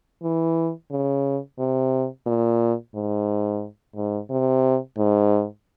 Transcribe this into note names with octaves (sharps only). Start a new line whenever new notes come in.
E3
C#3
C3
A#2
G#2
G#2
C3
G#2